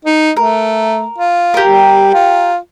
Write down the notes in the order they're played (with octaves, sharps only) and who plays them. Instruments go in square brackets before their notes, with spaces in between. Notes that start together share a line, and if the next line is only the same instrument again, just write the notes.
[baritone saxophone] D#4
[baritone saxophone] A3 [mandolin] A#4
[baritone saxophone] F4
[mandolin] G4 A#4
[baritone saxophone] G3
F4